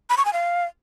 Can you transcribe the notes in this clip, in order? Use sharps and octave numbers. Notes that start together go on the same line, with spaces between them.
B5
C#6
G#5
F5